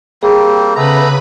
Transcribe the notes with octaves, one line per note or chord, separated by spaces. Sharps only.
G3 A#3 C4 G#4
C#3 A3 B3 B4 A#5 B5